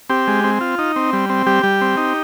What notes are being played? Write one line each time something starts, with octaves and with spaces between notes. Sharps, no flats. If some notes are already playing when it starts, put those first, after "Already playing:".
C4 G4
G#3
C4
F4
D#4
C4
G3
C4
G3 G4
G3
C4
D#4